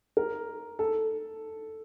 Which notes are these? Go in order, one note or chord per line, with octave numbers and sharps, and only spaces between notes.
A#4
A4